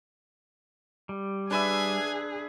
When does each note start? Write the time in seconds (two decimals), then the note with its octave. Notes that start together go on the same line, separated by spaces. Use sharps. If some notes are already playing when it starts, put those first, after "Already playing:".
1.09 G3
1.51 D4 G#4 B4 E5 G#5